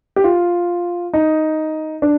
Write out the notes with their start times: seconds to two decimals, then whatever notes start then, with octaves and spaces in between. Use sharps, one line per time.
0.16 G4
0.24 F4
1.14 D#4
2.02 D4